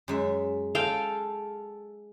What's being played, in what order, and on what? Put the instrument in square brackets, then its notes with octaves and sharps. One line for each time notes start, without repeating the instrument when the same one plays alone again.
[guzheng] F#2 G#3 E5
[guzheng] G#3 [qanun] A4 F5 G5